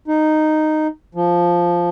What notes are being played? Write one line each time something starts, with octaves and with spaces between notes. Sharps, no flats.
D#4
F3